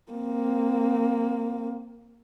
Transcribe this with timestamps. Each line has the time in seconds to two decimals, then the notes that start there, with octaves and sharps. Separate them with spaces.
0.12 A#3 C4